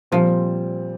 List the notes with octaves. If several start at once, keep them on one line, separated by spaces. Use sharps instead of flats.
A#2 F3 G3 C4